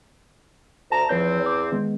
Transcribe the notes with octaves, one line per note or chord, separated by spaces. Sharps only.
D2 A5 A#5
E2 F3 C4 C#5 G6
D6
D#3 G#3 B3